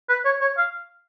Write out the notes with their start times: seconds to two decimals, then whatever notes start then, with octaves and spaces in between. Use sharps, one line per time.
0.09 B4
0.25 C#5
0.41 C#5
0.58 F5